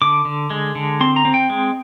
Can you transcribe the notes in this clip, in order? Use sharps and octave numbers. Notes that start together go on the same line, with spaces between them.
D3 D6
D3
G#3
D3
C4 C6
A#5
C4
G5
G#3